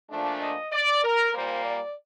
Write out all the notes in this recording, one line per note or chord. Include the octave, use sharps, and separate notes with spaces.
A#2 F3 A3 D4
D#5
D5
A#4
A#2 G3 A#3 C5
D5